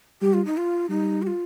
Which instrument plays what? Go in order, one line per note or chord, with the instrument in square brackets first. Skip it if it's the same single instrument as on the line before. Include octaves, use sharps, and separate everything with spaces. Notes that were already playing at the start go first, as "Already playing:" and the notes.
[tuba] G3 [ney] G4
[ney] F4
D#4
F4
[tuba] G3 [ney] D#4
[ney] G4
F4